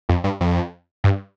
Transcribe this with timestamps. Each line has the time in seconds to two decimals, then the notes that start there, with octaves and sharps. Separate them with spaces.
0.09 F2
0.24 G2
0.41 F2
1.04 G2